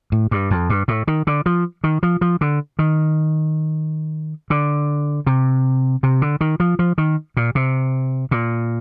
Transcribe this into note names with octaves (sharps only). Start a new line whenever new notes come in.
A2
G2
F2
G2
A2
D#3
D3
F3
D#3
F3
F3
D3
D#3
D3
C3
C3
D3
D#3
F3
F3
D#3
A#2
C3
A#2